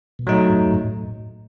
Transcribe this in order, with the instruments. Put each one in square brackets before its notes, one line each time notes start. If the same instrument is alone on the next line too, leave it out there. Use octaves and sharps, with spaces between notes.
[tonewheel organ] B2
[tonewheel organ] A2 [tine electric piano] F#3 A3 D#4
[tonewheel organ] G#2
F#2
G#2
A2